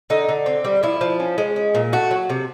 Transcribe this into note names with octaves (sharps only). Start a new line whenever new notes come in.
D3 D#4
D3
C4
G3
F3 E4
F3
C#4
G#3
C#4
A#2
A3 F#4
F#3
C3